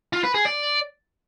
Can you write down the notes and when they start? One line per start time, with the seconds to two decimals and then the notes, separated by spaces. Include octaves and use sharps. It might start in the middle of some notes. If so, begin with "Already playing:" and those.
0.13 F4
0.24 B4
0.34 G#4
0.45 D5